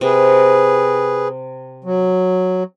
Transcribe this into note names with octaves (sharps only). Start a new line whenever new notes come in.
C3 G#4 B4
F#3